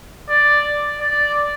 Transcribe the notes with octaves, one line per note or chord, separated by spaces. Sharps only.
D5
D5